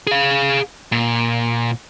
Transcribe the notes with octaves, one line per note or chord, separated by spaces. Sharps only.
G#4 F5
A#2